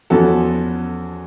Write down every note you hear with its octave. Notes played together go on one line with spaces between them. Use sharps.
E2 F3 B3 C#4 F#4 A4